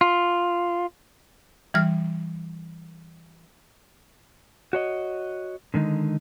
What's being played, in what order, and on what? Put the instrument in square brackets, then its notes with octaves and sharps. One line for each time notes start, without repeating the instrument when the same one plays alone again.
[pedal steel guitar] F4
[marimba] E3 G3 F6
[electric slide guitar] F#4 C#5 D#5
D3 D#3 G#3 D#4